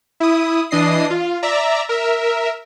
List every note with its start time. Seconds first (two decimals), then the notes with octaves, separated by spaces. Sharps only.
0.20 E4 D#6
0.71 E3 D4 D#5 D#6 C7
1.10 F4
1.43 D5 E5 A#5
1.89 A#4 E5